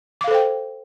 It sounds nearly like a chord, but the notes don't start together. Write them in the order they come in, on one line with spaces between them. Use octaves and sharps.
D6 F5 A4 C5 G5